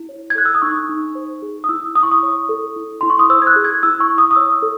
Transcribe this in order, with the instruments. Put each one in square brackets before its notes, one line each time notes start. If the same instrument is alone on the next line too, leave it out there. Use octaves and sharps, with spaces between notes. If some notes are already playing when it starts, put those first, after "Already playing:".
Already playing: [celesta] E4
C#5
G#6
A4 F#6
E6
D#6
D#4 C#6
D#4
C5
G#4
D#6
E4 E6
E4 D#6
C#6
D#6
C#5
A4
E4
E4 C6
C#6
D#6
C5 E6
G#6
F#6
G#4
G#6
E4 E6
C#6
E4
D#6
D#6
C#5 E6
A4